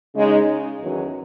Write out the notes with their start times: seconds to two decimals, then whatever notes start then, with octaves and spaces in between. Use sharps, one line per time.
0.15 C#3 G#3 D#4
0.80 E2 D#3 F#3 C#4